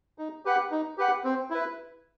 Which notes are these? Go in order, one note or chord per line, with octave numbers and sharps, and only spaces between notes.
D#4
G4 B4 F#5
D#4
G4 B4 F#5
C4
E4 B4